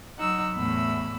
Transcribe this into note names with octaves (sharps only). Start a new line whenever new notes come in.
F#3 D#4 F#5 E6
E2 A2 B5 E6